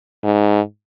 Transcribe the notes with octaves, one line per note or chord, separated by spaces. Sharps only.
G#2